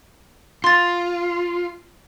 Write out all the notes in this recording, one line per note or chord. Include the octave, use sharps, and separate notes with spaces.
F4 C6 A6